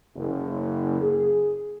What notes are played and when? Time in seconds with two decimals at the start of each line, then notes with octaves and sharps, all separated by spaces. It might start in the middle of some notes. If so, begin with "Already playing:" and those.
0.16 F#1
1.01 G#4